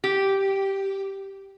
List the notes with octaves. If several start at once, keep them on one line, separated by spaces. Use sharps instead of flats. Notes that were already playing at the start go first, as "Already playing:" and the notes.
G4